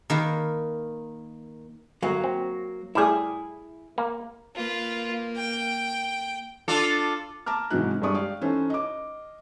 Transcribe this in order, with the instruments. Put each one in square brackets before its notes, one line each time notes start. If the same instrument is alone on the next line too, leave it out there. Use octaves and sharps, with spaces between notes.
[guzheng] D#3 A#3 B4
[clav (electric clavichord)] G1 [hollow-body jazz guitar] F#3 A#3
[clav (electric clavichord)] C4
[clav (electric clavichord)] A2 G3 [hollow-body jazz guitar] E4 G#4
[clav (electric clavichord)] A#3
[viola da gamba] A#3 [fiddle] F4 B4
[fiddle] G5
[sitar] D4 F4 A4
[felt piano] A5 A#5 D6 F6
G#2 C3 E3 F#3 D#4 F#6
G2 G3 G#3 D5 C#6 D#6
G4 D5 F5
E3 C#4 D#4 A4 C5
D#5 D6